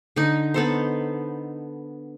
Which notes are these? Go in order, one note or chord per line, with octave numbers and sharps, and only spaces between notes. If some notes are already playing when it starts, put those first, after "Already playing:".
D3 D#4
B3 A4 C5